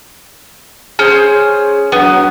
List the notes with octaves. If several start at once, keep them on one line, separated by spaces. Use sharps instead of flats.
C#4 G#4 C5
F#2 F#3 B3